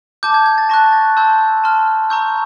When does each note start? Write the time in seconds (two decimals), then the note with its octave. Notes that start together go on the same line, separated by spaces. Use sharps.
0.23 A5 D6 G6
0.34 G#6
0.46 G#6
0.58 A6
0.69 A5 C#6 F#6 A#6
0.93 A6
1.17 A5 C6 E6 G6
1.64 A5 C6 F6
2.10 A#5 C#6 E6 G6